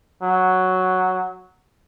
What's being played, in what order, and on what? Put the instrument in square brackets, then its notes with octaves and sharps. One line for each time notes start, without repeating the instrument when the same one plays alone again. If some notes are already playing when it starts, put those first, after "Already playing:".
[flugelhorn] F#3